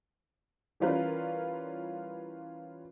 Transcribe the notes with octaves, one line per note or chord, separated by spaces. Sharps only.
E3 G3 C#4 F4 A#4 B4